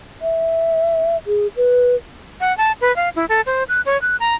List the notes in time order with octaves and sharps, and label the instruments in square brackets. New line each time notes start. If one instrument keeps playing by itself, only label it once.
[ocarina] E5
G#4
B4
[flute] F#5
A5
B4
F5
E4
A4
C5
F#6
C#5
F#6
A#5